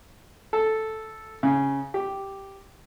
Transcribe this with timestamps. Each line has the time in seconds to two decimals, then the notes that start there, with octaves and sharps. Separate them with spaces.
0.53 A4
1.43 C#3
1.94 G4